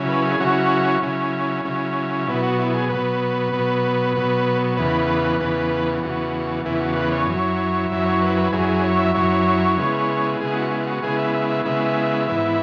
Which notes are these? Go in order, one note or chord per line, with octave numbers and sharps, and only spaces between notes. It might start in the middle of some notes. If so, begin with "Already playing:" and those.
Already playing: C#3 F#3 C#4 E4
B4
G#4
C#3 F#3 C#4 E4 F#4
C#3 F#3 C#4 E4
C#3 F#3 C#4 E4
B2 F#3 B3 E4
F#4
E4
G#4
B2 F#3 B3 B4
B2 F#3 B3
B2 F#3 B3
E2 C#3 E3 B3 B4
E2 C#3 E3 B3
E2 C#3 E3 B3 F#4
E2 C#3 E3 B3 E4
F#4
B4
C#5
F#2 F#3 E4 C#5
F#2 F#3 E4 E5
C#5
B4
B4
F#2 F#3 E4 G#4
G#4
C#5
E5
F#2 F#3 E4 C#5
C#3 G#3 B3 E4
C#3 G#3 B3 E4 G#4
F#4
E4
F#4
C#3 G#3 B3 E4 G#4
E5
E5
E5
C#3 G#3 B3 E4 E5
G#2 E3 B3 E4